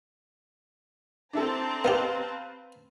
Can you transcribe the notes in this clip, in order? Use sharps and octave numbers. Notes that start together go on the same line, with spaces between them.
C4 D4 E4 A4 A5 A#5
B3 D#4 G4 B4 F5